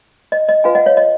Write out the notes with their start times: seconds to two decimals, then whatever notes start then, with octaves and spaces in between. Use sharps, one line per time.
0.32 D#5
0.49 D#5
0.64 F4 B4 F5 G#5
0.75 D#5 F#5
0.86 C#5 F5
0.97 D#5